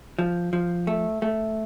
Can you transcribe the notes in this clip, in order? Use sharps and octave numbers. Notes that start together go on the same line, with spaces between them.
F3
F3
A3
A3